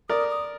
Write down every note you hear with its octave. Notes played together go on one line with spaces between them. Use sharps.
A#4 D5 D#6
D#6